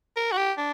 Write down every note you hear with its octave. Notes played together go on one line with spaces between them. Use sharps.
A#4
F#4
G4
D4